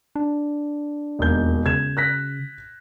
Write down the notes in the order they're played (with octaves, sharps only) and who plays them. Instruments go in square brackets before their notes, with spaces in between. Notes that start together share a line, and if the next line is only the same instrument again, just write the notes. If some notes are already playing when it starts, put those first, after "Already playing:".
[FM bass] D4
[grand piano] E1 D#2 G6
[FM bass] C#3 [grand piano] G#6 E7
[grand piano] F#6 A#6 B6